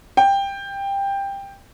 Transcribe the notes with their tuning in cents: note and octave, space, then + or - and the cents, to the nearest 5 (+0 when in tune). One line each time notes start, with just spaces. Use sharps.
G5 +15